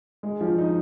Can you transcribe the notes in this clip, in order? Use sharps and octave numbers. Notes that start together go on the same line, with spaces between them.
G#3
F3
D#4